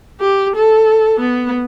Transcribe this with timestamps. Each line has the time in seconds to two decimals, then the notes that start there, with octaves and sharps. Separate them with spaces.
0.20 G4
0.55 A4
1.19 B3